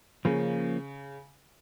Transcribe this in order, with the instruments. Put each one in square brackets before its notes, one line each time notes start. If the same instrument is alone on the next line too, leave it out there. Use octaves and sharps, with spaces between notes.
[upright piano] C#3 [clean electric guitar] F3 A#3 C#4